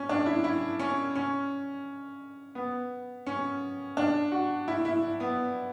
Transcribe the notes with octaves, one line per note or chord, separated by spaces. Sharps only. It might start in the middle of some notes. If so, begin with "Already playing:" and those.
Already playing: C#4
D4
E4
E4
C#4
C#4
B3
C#4
D4
F#4
E4
E4
B3